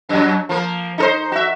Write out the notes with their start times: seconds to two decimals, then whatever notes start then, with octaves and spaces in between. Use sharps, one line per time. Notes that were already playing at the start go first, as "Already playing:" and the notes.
0.09 F#2 F#3
0.49 F3 A#3
0.98 D#4 A4 C5
1.32 F#4 E5